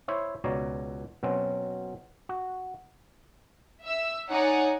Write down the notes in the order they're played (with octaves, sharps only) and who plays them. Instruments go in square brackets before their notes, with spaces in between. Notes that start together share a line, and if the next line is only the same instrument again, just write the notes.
[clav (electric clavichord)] E4 C5 C#5 E5
C#2 B2 C#5 D5 A#5
B2 F#3 C4 C#4
F#4
[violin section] E5 E6
D#4 C#5 D5 F#5 G#5